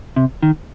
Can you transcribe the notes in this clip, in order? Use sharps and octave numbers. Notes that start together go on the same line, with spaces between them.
C3
D#3